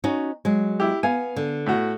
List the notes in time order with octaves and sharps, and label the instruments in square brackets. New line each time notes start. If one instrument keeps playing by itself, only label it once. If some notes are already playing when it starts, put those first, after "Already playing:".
[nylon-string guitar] C#4 D#4 F#4
F#3 G#3
[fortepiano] E4 G4
[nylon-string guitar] B3 [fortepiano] F5 G#5
[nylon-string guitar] D3
[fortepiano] A2 F#4